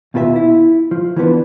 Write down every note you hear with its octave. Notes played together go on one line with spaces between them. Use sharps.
D#2 B2 F4 A4 E5
E4
F3
E3 F3 B3 D4